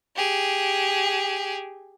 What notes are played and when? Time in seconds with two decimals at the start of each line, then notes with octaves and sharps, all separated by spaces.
0.16 G4 G#4